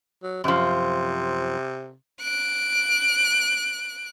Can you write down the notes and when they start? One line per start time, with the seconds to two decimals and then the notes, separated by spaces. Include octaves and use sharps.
0.23 F#3
0.44 F#2 C3 F3
2.22 F#6 D7